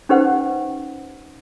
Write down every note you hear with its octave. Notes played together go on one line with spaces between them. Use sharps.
C#4 D#4 G4 B4 C5 F#5